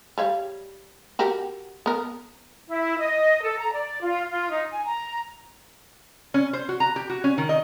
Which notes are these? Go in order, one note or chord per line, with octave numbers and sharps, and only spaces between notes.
G3 C#5 F5
F#4 G4 A#4
B3 A#4
E4
D#5
A4
A#5
D5
F4
F4
D#4
G#5
A#5
C#4
C5
F#4
A#5
G4
F#4
C#4
D#3
D#5